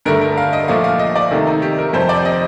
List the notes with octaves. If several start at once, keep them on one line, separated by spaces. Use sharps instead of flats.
G2 D3 A3 A#4
A#4
F5
D#5
A#2 F3 A3 F5
F5
D#5
D5
C3 D#3 A3
D#4
G4
A#4
F2 C3 G3 C5
D5
D#5